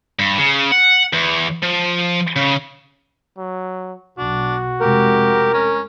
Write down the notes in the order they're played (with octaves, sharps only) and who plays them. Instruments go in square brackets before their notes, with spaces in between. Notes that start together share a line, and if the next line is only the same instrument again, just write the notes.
[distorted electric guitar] G2
C#3
F#5
E2
F3
C#3
[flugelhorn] F#3
[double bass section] B1 [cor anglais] D4 [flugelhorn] F#4
[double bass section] F1 C3 G#3 [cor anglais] G4 [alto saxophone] A#4
[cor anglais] C#4